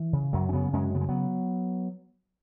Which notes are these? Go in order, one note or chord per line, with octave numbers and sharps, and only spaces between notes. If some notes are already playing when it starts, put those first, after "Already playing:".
Already playing: E3
C#3
F#2 F#3
C#4
C#3 F#3 B3
F#2 G#3 C#4
C#3 B3
G#3
F#3 B3